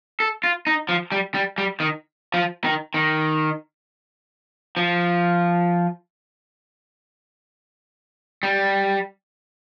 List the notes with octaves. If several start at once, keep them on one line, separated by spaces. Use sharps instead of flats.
A4
F4
D#4
F3
G3
G3
G3
D#3
F3
D#3
D#3
F3
G3